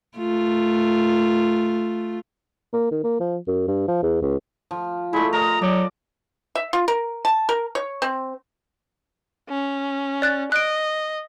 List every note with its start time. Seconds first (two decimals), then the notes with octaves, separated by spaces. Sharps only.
0.18 A3 F4
2.73 A#3
2.91 D#3
3.04 A#3
3.20 F3
3.47 F#2
3.68 G2
3.88 F3
4.03 E2
4.22 C#2
4.71 F3
5.13 G#3 A3 E4
5.33 A#4 D#5 A#5
5.62 F#3 D5
6.55 E5
6.73 F4
6.88 A#4
7.25 A5
7.49 A#4
7.75 C#5
8.02 C4
9.49 C#4
10.22 D5 F#6 A6
10.52 D#5 F#6 D7